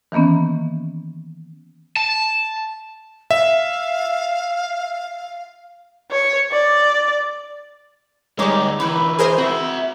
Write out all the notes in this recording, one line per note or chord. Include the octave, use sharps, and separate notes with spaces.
D#3 E3 A#3 B3 C#4
A5
E5 F5
C#5
D5
D2 G3 G#3 D#4 C#5 D6
E3 D#4 E4 B4
G#4 A#4 C5
C4 F#4 E5